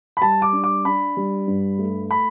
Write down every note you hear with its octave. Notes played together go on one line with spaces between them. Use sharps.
B5
G3 A5
D6
D4
D6
D4 B5
G3
G2
A3
B5